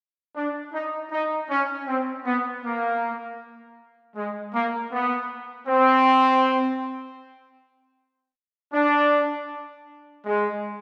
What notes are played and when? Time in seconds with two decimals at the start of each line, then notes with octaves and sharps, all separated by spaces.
0.36 D4
0.73 D#4
1.11 D#4
1.50 C#4
1.87 C4
2.26 B3
2.64 A#3
4.16 G#3
4.54 A#3
4.92 B3
5.68 C4
8.73 D4
10.26 G#3